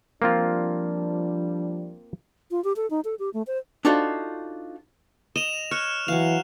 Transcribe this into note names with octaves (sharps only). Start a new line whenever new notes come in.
F3 G3 A#3 C4 D4 F4
F4
G4
A4
D#4
A4
G4
A3
C5
D4 D#4 F4 F#4 A4 C5
D#5 E7 F7
C#5 F6 F#6
E3 F#3 F5 F7